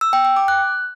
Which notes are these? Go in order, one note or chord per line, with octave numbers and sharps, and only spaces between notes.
E6
G5
G5
D6
F#6